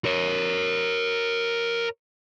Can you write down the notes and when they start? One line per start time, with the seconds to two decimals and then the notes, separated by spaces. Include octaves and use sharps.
0.05 A#4 C#5